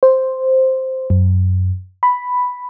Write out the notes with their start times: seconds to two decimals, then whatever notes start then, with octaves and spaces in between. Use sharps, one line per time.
0.03 C5
1.10 F#2
2.03 B5